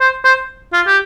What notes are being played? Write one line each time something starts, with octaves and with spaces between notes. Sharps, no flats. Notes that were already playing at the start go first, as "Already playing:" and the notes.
C5
C5
F4
G4